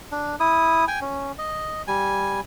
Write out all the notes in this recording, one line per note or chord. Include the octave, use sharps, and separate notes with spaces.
D4
E4 D#6
G5 G#5
C#4
D#5
G3 G#5